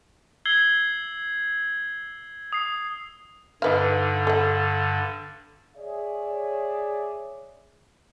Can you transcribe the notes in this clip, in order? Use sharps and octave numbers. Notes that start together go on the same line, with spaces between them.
E6 G#6 C7 F#7 G7
D#6 C7
G2 D3 D#4 B4 F5
A4 F#5
G#4 C#5 D5 E5